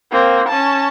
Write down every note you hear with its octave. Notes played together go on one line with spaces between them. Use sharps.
A#3 C4
C#4 A5